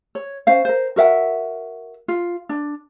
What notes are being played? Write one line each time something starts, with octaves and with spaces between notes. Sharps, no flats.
C#5
C#4 C5 F5
A#4 C5
F#4 A#4 E5 F#5
F4
D4